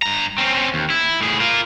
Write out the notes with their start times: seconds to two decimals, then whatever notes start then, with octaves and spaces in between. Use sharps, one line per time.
0.02 G2 A#5
0.38 C4 C#4
0.74 D#2
0.90 E4
1.21 A2 G#4
1.40 F4 A#4